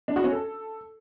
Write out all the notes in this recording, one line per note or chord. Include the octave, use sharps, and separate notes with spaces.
D4
F#4
C#4
A4